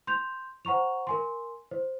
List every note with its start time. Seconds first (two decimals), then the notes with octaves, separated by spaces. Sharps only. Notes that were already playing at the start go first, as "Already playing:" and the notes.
0.07 C6 G6 F7
0.65 C5 F#5 A#5 C#6 F7
1.07 A#4 G#5 C6
1.71 C5